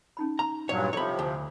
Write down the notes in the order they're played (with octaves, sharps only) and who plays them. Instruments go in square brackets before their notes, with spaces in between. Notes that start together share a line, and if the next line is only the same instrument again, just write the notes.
[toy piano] C#4 D#4 B5
[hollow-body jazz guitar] A#5
[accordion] G2 A#2 F#3 [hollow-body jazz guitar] C#5
[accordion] C3 F3 [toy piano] E4 A4 E5 [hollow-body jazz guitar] C#5 B5
[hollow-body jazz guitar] D2